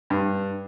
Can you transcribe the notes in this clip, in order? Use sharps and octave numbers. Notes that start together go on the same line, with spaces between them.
G2